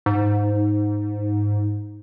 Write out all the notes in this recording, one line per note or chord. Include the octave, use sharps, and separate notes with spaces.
G#2